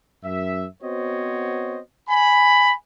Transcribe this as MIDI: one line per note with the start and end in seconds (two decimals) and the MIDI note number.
0.24 0.65 42
0.24 0.65 76
0.83 1.79 59
0.83 1.79 60
0.83 1.79 66
0.83 1.79 72
0.83 1.79 73
0.83 1.79 75
2.09 2.74 80
2.09 2.74 83